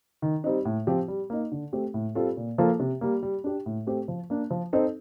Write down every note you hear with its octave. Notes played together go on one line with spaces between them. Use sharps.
D#3
G3 C4 D#4
A2
F3 C4 G4
G3
A#3 D#4
D3
A3 C4 G4
A2
G3 C4 F4 A4
A#2
F3 A#3 F4 A4
C3
G3 A#3
G3
D4 G4
A2
A3 C4 G4
F3
A#3 D4
F3
C4 D#4 A4